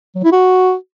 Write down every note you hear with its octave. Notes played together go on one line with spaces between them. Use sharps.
F#3
E4
F#4